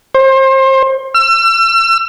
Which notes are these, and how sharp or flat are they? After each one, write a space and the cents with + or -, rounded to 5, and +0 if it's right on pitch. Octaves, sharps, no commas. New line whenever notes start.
C5 +30
E6 +40